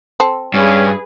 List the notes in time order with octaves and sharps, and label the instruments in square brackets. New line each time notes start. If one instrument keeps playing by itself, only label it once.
[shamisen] C4 A4
[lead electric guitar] G2 [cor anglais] C#4 [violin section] G#4 B4